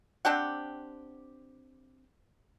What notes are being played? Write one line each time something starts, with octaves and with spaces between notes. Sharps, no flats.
C4 D4 G4 F#5